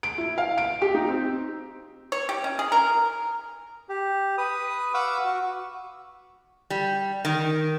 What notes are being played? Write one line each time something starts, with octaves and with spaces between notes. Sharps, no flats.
D7
E4
F5
D7
G4
D#4
C4
C#5
G4
C#4
G#4
A#4
G4
B4 D#6
F5 F#5 C#6 D6 E6
F#4 C#6
G3
D#3